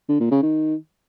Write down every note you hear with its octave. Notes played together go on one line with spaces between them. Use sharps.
D3
A#2
C#3
D#3